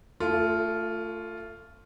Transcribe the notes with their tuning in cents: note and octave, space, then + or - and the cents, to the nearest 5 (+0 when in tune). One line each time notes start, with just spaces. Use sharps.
A3 +30 F4 +0 A4 -20